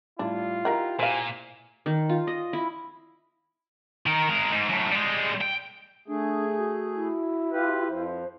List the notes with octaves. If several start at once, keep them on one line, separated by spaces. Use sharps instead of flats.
A2 G3 D4 E4 F4
D#4 E4 G4 A#4 F#5
A#2 C5 F5 G#5
D#3
F4
D#5
E4
D#3 A#4
G#3 A#4
G#2
F#2 A2
G3 G#3
G5
A3 D4 G#4
F#4
E4
F4 G4 B4
F2 F3 C5